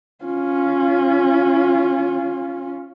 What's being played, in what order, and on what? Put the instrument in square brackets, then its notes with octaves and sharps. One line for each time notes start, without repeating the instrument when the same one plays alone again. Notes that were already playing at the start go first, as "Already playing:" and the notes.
[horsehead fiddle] C#4 F4